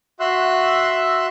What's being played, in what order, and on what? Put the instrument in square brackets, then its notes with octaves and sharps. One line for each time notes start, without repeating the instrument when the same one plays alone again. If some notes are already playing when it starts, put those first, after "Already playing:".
[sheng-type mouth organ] F#4 E5 C6 E6 F#6